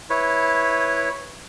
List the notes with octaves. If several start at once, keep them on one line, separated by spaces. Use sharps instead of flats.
E4 B4 C#5